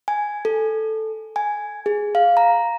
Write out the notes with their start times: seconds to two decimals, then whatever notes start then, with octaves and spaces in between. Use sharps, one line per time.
0.08 G#5
0.45 A4
1.36 G#5
1.86 G#4
2.15 F5
2.37 A#5